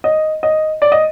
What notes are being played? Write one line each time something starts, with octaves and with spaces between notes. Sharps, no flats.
D#5
D#5
D5
D#5